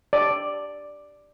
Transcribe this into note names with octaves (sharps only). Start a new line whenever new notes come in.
D5